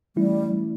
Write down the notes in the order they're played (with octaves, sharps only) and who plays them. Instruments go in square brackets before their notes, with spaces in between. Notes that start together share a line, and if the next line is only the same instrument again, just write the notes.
[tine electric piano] E3 A3 C#4 E4 [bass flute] G3